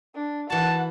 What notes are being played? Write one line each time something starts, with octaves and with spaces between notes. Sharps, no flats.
D4
E3 F#4 F#5 A5